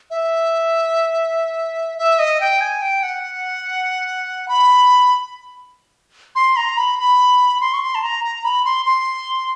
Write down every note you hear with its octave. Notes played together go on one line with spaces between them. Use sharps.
E5
E5
D#5
G5
G#5
G5
F#5
B5
C6
A#5
B5
B5
C6
C#6
C6
A5
A#5
A#5
B5
C6
C6